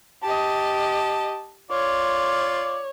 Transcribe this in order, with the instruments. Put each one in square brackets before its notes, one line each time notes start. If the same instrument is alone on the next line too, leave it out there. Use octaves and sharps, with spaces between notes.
[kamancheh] G4 D#5 [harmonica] A5
[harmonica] F4 D5 [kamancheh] C#5